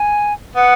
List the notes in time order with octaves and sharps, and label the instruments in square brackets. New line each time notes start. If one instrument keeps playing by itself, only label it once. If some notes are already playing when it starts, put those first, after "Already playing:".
Already playing: [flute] G#5
[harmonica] B3 [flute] F#5